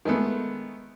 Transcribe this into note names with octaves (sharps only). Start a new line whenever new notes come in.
D#3 G#3 A3 B3